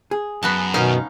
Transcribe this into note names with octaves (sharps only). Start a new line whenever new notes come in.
G#4
F#2 B3 F#4 A5
B2 D#3 B3 C#4 D#4 A#4 F5